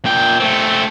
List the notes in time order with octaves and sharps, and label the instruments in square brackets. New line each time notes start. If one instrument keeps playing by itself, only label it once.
[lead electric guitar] A#2 G5
A3 C4